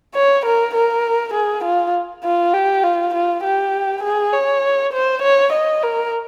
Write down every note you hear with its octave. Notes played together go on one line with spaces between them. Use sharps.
C#5
A#4
A#4
G#4
F4
F4
G4
F4
F4
G4
G#4
C#5
C5
C#5
D#5
A#4